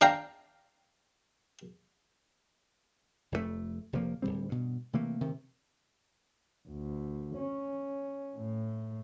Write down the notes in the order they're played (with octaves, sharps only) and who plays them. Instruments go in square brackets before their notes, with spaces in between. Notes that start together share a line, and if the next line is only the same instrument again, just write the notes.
[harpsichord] D4 F5 G5 A#5
[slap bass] F1 F2 A#2 A3
F1 C3 F3 A#3
D1 G2 G3 C4
G2 B2
C3 E3 A3 A#3
C3 D#3
[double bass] D2
C#4
A2